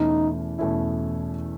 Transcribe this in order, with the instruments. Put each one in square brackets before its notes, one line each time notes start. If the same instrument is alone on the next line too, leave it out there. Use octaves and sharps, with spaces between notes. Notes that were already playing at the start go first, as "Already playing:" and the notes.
Already playing: [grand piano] E2 B2 A3 C#4 E4 [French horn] D#4
[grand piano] E2 B2 A3 C#4 E4